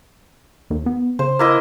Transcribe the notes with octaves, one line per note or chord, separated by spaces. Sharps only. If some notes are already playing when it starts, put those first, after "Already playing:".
D#2
B3
C#3 C5
A#3 E4 D#5